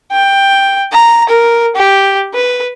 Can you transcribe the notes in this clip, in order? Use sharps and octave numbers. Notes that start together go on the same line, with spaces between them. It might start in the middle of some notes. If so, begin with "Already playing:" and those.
G5
A#5
A#4
G4
B4